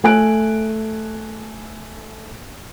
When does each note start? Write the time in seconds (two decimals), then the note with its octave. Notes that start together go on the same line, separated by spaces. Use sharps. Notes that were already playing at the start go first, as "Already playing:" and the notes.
0.04 A3 G#5 F#6 D7